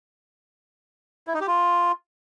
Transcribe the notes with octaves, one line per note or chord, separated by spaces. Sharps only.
E4
D#4
G4
F4